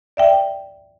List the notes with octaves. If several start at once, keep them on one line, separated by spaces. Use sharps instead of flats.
D5 E5 G5